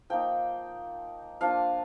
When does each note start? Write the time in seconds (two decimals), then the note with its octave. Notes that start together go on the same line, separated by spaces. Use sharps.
0.10 F3 A#3 D#4 G5
1.41 F3 A#3 D4 F4 F5